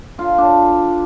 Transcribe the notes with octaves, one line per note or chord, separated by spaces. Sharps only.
D3 F4
D4